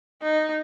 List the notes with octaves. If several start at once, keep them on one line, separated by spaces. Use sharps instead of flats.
D#4